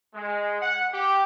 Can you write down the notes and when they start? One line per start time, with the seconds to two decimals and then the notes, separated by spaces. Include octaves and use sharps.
0.15 G#3
0.61 F#5
0.92 G4